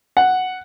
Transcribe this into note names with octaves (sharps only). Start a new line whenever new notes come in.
F#5